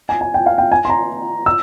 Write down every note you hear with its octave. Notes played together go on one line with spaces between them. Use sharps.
G#5
G#5
G5
F5
G5
G#5
C6
A#5
E6